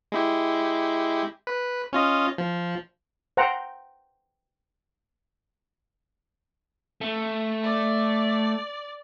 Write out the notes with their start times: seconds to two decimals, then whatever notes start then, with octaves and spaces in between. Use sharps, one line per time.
0.12 G#3 E4 G4
1.47 B4
1.93 C#4 F4 D#5
2.38 F3
3.37 C5 F#5 G5 A#5
7.01 A3
7.63 D5